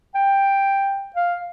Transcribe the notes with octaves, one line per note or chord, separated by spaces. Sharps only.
G5
F5